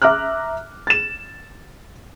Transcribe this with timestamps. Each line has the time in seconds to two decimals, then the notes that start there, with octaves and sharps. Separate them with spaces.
0.02 E5 A#5 D6 F6 F#6
0.87 A6 E7